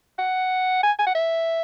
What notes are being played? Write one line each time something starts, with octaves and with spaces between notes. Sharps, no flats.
F#5
G#5
G#5
F#5
E5